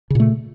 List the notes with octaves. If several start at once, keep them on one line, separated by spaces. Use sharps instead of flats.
A#2 C#3 A3